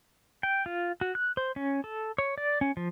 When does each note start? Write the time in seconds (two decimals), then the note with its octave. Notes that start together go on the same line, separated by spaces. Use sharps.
0.43 G5
0.66 F4
1.01 F#4
1.15 F#6
1.37 C5
1.56 C#4
1.84 A4
2.18 C#5
2.38 D5
2.61 C#4
2.77 F3